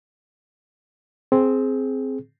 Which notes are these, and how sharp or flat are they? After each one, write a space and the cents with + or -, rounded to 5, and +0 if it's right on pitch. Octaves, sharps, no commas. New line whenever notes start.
C4 +0 G#4 +15